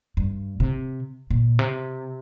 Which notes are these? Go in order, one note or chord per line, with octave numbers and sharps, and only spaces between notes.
G2
C3
A#2
C3